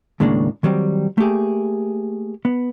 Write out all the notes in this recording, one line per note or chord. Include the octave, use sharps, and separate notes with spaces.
D#2 A2 C#3 G#3 A#3 D4
D#3 F#3 G3 C4
A3 A#3 G4 G#4
B3